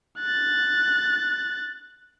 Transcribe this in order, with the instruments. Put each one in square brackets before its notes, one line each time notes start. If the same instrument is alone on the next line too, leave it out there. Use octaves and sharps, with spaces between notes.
[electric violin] F#6 A6